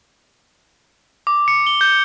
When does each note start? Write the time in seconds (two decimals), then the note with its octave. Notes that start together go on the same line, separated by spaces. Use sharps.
1.27 D6
1.48 C#7
1.67 G7
1.81 G6